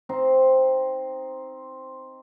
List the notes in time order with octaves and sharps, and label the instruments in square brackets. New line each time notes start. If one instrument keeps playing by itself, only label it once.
[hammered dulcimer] C4 D#4 C5